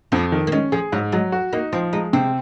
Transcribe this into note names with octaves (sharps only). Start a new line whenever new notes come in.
F2 F3
D#3
A#3
G#3 C#4
F3 G#4
G#2 F#3
F#3 G#3
F#4
A#3 D#4
F3 C4
G#3 D#4
C3 C4